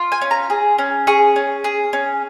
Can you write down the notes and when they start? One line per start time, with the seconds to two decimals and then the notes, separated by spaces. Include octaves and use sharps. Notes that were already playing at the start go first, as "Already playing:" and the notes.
Already playing: F4
0.12 G#5
0.21 C#4
0.31 A#5
0.50 G#4
0.78 C#4
1.07 G#4 C#6
1.36 C#4
1.64 G#4
1.93 C#4